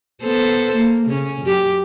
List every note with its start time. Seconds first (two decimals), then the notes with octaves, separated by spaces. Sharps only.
0.23 B3 A4 C5
0.75 A#3
1.07 C#3 C#4
1.42 F#2 G4